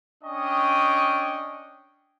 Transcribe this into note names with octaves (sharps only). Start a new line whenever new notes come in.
C#4 D4 D#5 G5 C#6 D#6